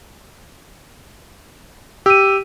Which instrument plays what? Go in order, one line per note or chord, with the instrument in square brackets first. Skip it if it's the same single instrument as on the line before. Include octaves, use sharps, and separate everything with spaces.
[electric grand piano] G4 [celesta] E6 D#7